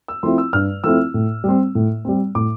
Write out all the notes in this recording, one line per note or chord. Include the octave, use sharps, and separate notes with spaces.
E6
F3 A3 C4 E4 C6
E6
G2 F6
F3 A3 C4 E4 E6
A2
G3 C4
A2
G3 C4
A2 D6